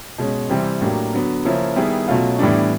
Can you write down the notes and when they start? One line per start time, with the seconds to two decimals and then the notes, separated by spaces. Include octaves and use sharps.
0.18 B2 G#3 C#4
0.49 C3 E3 G3 C4
0.81 A2 F#3 A#3 D4 G4
1.13 D3 F#3 B3
1.45 C#3 F3 A#3 C#4 E4
1.76 D#3 G3 B3 E4 G#4
2.08 B2 F#3 A3 C#4 F4
2.39 A2 E3 G3 B3 D4